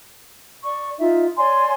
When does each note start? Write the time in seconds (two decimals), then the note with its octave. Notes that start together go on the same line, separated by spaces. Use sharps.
0.64 D5 C#6
0.99 D#4 F4 E5
1.37 C#5 D5 G#5 C6